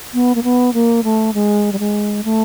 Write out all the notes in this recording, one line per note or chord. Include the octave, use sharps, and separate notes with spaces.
B3
A#3
B3
A#3
A3
G#3
G3
G#3
A3